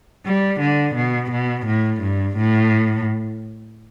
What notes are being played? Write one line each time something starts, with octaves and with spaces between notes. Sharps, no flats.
G3
D3
B2
B2
A2
G2
A2